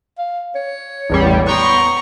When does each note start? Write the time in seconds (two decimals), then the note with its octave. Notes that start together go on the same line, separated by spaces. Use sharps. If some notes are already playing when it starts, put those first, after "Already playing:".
0.18 F5
0.55 C#5
1.10 A1 E2 G3
1.47 B3 G5 A#5 C6 C#6